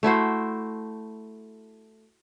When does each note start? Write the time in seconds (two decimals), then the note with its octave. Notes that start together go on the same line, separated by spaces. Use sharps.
0.03 A3 E4 F#4 C5